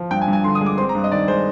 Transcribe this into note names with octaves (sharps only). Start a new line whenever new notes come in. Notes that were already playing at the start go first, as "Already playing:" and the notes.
Already playing: F3
G2 G5
G#5
G2
G#5
D3 C6
D#6
G#3
D6
C4 C6
A#5
G2
D#5
D#3 D5
G#3 C5